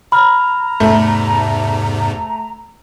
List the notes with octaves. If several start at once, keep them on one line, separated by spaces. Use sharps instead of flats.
A#5 B5 F6
E2 G#2 C3 A3